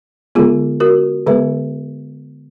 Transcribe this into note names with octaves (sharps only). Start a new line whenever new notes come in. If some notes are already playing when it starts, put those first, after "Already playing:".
D3 G#3 B3 F4 G#4
F#4 A#4
D3 G#3 B3 G#4 B4